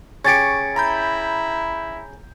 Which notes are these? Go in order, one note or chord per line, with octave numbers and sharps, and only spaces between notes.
C#3 G4 C#6 G#6 A6 C#7 D7
E4 A#5 B5 G6